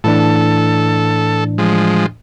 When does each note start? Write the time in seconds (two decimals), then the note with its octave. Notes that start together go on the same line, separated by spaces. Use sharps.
0.04 A2 E3 D4 A4
1.58 F3 G#3